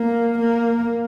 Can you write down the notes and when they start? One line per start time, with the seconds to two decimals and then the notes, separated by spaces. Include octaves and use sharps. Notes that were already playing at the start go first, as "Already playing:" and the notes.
Already playing: A#3
0.40 A#3